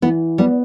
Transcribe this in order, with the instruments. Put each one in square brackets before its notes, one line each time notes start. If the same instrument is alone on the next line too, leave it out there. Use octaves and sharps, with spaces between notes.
[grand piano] E3 [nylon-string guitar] B3
[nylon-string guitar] G3 [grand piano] B3